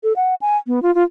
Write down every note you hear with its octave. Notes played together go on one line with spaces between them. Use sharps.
A4
F#5
G#5
B3
F4
F4